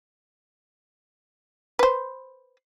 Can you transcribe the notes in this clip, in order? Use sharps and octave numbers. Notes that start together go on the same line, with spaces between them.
B4 C5